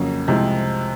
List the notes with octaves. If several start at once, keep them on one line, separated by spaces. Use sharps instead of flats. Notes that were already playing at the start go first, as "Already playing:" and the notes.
Already playing: F2 C#3 F#3 A#3 C#4
C2 C3 F3 G#3 C4